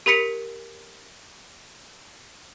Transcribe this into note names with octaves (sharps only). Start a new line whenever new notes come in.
G4 A#4 B5 B6 C#7